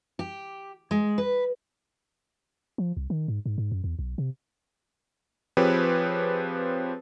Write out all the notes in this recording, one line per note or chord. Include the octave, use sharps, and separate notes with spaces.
G4
G#3
B4
F3
C2
D#3
G#2
G#2
G#2
F#2
E2
B1
C3
F3 C4 G4 G#4 B4 C#5